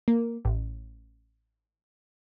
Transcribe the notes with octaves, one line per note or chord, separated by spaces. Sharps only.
A#3
A1